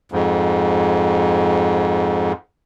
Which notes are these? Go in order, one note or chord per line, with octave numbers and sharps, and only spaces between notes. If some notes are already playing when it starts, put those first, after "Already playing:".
F2 G#2